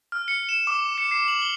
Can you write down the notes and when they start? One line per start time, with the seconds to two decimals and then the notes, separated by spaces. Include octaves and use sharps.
0.12 F6
0.28 C#7
0.49 E7
0.67 D6
0.98 C#7
1.11 C7
1.28 F#7
1.42 G7